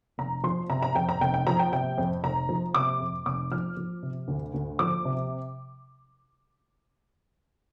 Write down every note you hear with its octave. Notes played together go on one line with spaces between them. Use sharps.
F1 A#5
F3 C6
C3 A#5
A#5
F2 G5
A#5
F1 G5
G5
F3 A#5
G5
C3 G5
F2
F1 A#5
F3
C3 D6
F2
F1 D6
F3 F6
F3
C3
D2
D2
F3 D6
C3